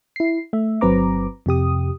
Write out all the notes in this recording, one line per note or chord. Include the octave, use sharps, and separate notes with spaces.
E4 C7
A3 E5
G1 F#3 C4 B4 A#5 D6
F2 C3 G4 D#6